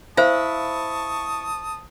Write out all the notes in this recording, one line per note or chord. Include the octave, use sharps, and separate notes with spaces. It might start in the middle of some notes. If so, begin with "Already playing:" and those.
E4 C5 F5 A5 C#6 D#6